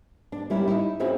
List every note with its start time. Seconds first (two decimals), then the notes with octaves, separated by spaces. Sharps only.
0.32 D4
0.50 G3 A#3 C#4 E4
0.68 D#4 E4
1.00 C4 C#4 D#4 E4 F#4 G#4